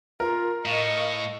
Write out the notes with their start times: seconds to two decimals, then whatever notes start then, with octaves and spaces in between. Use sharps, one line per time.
0.20 F4 A#4
0.65 A2 D#5 F5 C#6